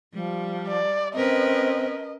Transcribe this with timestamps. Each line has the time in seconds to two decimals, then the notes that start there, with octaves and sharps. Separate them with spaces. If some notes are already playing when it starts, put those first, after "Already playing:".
0.13 F3 G3
0.67 D5
1.14 C4 C#4 A#4 B4 D#5